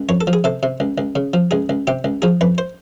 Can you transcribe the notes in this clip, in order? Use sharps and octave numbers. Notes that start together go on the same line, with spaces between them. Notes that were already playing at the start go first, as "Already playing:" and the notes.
Already playing: C#2
F2 C#5
A4
F3
G#4
C3 A4
C3
C#2
C#2
C#3
F3
C#2 G#4
C#2
C3 G4
C#2
F3 G#4
F2 B4
C5